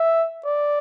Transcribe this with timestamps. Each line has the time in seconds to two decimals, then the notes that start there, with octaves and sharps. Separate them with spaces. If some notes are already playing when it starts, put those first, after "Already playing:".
Already playing: E5
0.46 D5